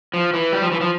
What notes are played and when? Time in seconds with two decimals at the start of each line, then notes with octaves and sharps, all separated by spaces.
0.14 F3
0.34 E3
0.53 G3
0.62 F3
0.72 E3
0.81 F3